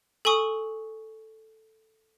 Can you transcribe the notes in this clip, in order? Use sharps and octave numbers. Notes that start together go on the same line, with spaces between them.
A4 G#5 C#6 D#6